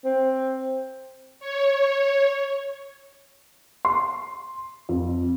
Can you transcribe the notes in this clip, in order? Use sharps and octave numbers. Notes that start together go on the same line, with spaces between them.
C4
C#5
C6
F2